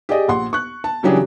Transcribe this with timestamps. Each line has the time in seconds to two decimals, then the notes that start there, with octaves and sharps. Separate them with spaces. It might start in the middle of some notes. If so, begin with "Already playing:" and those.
0.09 G4 G#4 D5 D#5
0.28 A#1 F#5 C6
0.53 C#6 F#6
0.84 A5
1.03 C#3 E3 F#3 D4 G4 G#4